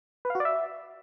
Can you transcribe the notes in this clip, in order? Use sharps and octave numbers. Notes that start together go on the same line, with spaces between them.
B4
F5
F#4
D5
E5